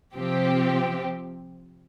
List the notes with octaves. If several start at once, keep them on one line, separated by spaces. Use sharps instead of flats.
C3 F3 C4 G4